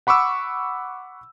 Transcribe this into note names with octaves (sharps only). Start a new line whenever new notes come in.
F#5 B5 C#6 D6 E6